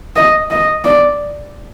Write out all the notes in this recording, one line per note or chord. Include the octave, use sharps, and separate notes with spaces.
D#5
D#5
D5